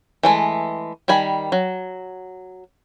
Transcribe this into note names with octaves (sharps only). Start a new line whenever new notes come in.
E3 G#3 A3
D#3 G3 G#5 B5
F#3